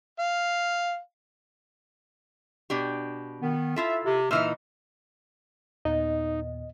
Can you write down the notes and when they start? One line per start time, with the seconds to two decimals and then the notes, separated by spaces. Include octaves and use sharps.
0.19 F5
2.70 B2 D4 G4
3.41 D#3 B3
3.76 E4 F4 A4 E5
4.04 C3
4.31 A#2 E3 D#4 E5 E6 F6
5.85 D#2 A#2 B3 D#4 D#5